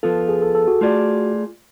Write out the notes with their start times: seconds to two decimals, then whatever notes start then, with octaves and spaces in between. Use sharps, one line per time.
0.03 F3 B3 F4 A4
0.29 G#4
0.42 A4
0.55 A4
0.68 F#4
0.81 A3 F4 G#4 D5